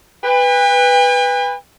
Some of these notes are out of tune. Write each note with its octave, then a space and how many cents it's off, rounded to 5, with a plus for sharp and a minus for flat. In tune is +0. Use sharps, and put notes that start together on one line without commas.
B4 +0 G5 +45